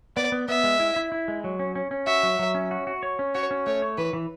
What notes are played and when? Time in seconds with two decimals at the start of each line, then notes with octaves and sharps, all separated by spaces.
0.17 B3 D5
0.32 B3
0.48 B3 E5
0.64 G#3
0.80 E4
0.96 E4
1.12 E4
1.28 G#3
1.44 F#3
1.59 C#4
1.75 C#4
1.91 C#4
2.07 F#4 E5
2.23 F#3
2.39 F#3
2.55 C#4
2.71 F#4
2.87 F#4
3.03 C#5
3.19 C#4
3.35 F#4 C#5
3.51 C#4
3.66 A3 C#5
3.82 C#5
3.97 E3 B4
4.13 E3